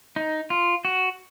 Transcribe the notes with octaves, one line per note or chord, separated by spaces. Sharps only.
D#4
F4
F#4